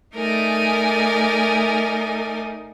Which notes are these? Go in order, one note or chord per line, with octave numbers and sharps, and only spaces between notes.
A3 D#4 A#4 D5 G#5